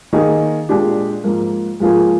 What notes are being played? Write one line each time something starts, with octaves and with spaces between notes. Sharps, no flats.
D#3 A#3 D#4 G#4
A#2 G#3 D4 G4
G#2 F3 A#3
G#2 F3 A#3 F4 G#4